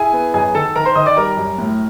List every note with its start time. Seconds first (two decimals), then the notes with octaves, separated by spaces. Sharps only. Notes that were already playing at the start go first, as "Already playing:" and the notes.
Already playing: E4 G#4 G#5
0.13 B3
0.34 F#2 G#4 G#5
0.54 D#3 A4 A5
0.75 D#3 A#4 A#5
0.85 C5 C6
0.96 D#3 D#5 D#6
1.06 D5 D6
1.17 G3 A#4 A#5
1.37 F#2
1.58 A2